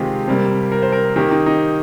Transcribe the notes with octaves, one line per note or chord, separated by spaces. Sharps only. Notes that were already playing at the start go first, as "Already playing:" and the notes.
Already playing: C3 D#3 G#3 F4 G4
C3 G3 A#3
A#4
C5
A#4
D#3 A#3 G4
D#4
D#4